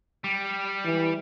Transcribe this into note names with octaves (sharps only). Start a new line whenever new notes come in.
G3
E3